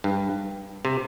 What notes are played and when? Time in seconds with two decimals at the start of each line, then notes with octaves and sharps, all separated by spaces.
0.04 G2
0.85 C3